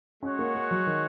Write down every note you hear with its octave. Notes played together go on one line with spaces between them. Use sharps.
G#3 C#4 F#4 C#5 F#5
A#3
A#3
F#3
D#3